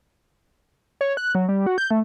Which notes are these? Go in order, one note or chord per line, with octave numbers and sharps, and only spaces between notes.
C#5
F#6
F#3
G3
F#4
G6
A3